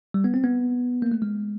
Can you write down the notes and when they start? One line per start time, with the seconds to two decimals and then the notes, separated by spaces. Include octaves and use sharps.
0.14 G3
0.24 B3
0.34 C4
0.44 B3
1.02 A#3
1.12 A3
1.22 G#3